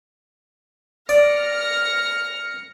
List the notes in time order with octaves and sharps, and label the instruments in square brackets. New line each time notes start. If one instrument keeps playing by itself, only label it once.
[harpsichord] D5 [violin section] F6 A#6 C#7